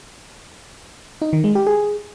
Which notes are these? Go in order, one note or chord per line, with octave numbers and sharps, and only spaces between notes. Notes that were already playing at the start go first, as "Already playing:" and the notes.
D#4
D#3
G#3
G4
G#4